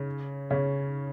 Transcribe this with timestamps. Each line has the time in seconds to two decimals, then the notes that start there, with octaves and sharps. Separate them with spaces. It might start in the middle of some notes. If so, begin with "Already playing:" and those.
Already playing: C#3 C#4
0.50 C#3 C#4